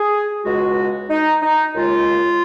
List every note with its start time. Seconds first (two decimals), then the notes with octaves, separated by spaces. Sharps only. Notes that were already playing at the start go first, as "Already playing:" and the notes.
Already playing: G#4
0.44 C#2 B2 G#3 F#4
1.10 D#4
1.42 D#4
1.74 D#2 C#3 G#3 F4